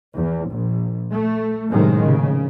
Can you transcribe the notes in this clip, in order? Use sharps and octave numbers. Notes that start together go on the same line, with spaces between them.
E2
A#1
A3
F#2 A2 C3 D#3 G#3
F1 C#3